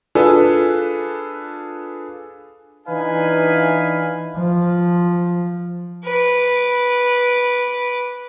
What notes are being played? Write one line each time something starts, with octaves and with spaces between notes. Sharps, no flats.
D4 F4 G#4 A4 B4
E3 D4 D#4 B4 F5 G#5
F3
B4 D6